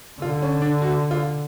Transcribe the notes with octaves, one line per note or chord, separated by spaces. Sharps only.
D3 F4
C#4
D4
F#4
F4